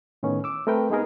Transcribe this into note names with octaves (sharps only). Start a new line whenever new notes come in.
A2 D#3 B3 C#4
D6 E6
A3 C4 A#4 B4 G5
G#3 B3 D#4 G#4 A#4